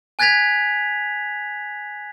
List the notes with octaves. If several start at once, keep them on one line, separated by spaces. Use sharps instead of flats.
G#5 F#6 G#6 A6 B6 F7